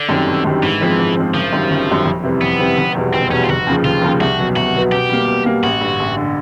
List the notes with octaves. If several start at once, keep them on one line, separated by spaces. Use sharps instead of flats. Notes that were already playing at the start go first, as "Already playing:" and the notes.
Already playing: D3
F#2 D#3 G3 C4
G1
F#2 D#3 G3 C4
G#2 E3
F3 G#3 C4
G#2
F3 G#3 C4
F#1 F3
F#2 D#3 G3
F#1
F#2 D#3 G3
F2
C3 E3 G3 C4
F2 B3
C3 E3 G3 C4
F1
E2 B2 G3
F1 C4
E2 B2 G3 C#4
F4
F1 F#4
D#2 C#3 F3
F1 F4
D#2 C#3 F3
C2 F#4
B2 F#3 B3
C2 F#4
B2 F#3 B3
B2 G4
G3 A#3
B2
G3 A#3
A1 F#4
G2 D3
A1
D3